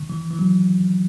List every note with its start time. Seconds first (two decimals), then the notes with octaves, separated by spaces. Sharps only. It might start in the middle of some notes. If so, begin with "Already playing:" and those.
Already playing: D#3
0.10 E3
0.31 E3
0.39 F#3